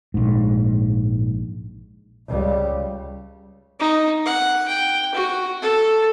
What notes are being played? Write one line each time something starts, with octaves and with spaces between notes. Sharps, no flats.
A#1 G#2
C#2 G3
D#4
F#5
G5
F#4
A4